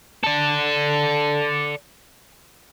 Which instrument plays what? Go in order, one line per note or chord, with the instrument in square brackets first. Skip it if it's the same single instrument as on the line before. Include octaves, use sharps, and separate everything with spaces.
[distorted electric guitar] A4 D5